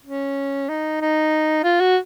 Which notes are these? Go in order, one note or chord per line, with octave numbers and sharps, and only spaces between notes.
C#4
D#4
D#4
F4
F#4